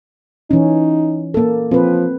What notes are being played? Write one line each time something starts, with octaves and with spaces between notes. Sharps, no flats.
E3 C#4 D#4
A#3 A4
F3 C4 B4